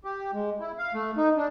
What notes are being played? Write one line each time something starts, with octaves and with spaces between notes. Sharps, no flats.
G4
G#3
E4
F5
A3
D#4
D4